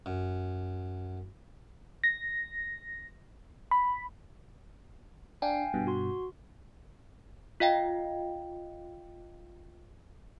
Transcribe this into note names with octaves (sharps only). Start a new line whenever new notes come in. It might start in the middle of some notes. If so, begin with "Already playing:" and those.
F#2
A#6
B5
D4 F5 G5 G#5
G2 B2
F#4 C6
F4 D#5 F5 G5